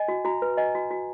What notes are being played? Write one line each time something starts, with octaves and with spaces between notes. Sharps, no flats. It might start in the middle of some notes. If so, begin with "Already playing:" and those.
Already playing: D#5 G#5
F#4
F#4 A#5
B4
D#5 G#5
F#4
F#4